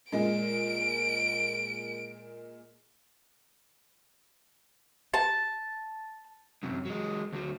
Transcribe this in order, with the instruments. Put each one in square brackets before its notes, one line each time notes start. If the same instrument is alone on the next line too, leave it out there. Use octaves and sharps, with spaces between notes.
[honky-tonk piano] A#2 G#3 [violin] D7
[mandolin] A5
[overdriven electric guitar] F#2 C3
F#3 G#3
D2 F#3